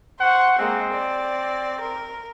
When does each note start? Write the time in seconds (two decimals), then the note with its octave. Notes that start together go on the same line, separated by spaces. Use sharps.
0.20 C5 F#5 C#6
0.59 G#3 A#3 C4
0.93 D5
1.81 A#4